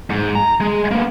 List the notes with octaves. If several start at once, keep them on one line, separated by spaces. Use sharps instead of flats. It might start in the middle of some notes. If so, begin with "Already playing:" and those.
G#2
A#5
G#3
A#3 B3